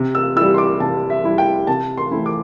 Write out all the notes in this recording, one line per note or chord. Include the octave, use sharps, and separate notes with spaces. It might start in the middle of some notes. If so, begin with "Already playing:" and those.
Already playing: C3
E6
E4 E6
G3
C6
D6
C3 A5
E5
G3 E4
G5
C3 A5
C6
E3 A3 C4 E4
D6